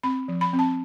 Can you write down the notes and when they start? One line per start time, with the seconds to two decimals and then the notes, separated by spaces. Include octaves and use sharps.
0.03 C4 B5
0.28 F3
0.41 B5
0.53 C4
0.59 A5